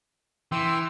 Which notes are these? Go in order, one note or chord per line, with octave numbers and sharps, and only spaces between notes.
E3 G5 C6 E6